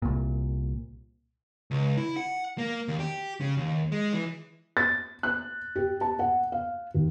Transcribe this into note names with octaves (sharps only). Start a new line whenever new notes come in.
C2 A#2
C#2
E4
F#5
A#3
D#2
G4
C#3
D#2
G#3
E3
A6
F#6
G4
A5
F#5
F5
D#2